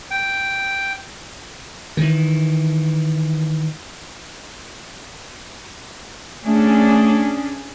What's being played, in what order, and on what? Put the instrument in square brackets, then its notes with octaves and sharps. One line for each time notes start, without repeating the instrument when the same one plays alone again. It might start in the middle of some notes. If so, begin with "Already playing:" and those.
[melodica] G5
[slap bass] D#3 E3
[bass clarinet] A3 [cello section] C#4 D4 G#4